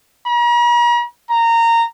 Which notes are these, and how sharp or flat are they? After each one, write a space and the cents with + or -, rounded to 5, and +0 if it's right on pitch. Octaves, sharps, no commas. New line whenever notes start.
A#5 +45
A#5 -15